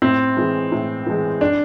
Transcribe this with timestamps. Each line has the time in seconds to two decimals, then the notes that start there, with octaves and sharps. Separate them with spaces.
0.02 A2 C4
0.37 E3 G#3
0.72 A2
1.06 E3 G#3
1.41 D4